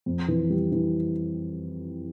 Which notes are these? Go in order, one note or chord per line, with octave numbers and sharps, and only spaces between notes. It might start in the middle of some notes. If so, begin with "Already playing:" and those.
F2
E3
G3
E3